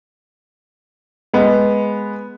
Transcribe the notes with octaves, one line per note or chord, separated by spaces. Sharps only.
G#3 B3